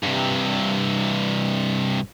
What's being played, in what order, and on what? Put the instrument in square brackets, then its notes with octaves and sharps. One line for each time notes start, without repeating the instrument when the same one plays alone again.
[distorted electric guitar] G2 C3